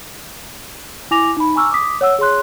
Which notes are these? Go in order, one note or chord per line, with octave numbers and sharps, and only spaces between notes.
E4 G#5 D6 A#6 F7
D#4 B5
G#5 A#5 C#6 D6 E6 F6
D6 D#6 B6
C#5 F#5 E6
G#4 C#5 C6 F#6